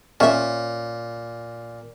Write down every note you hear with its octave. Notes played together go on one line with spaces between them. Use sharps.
A#2 C#4 E5